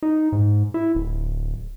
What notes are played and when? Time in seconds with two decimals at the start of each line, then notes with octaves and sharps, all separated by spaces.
0.03 D#4
0.32 G#2
0.74 E4
0.95 D1